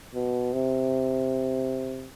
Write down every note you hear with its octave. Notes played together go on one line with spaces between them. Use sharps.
B2
C3